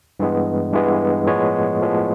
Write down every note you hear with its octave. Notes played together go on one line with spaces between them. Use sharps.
G2 E3 G#3 B3
G2 E3 G#3 B3
A2 F3 G#3 B3 C#5
A2 F3 G#3 B3